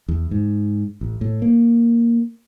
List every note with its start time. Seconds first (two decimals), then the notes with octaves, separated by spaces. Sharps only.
0.08 E2
0.31 G#2
1.01 A1
1.21 A2
1.42 A#3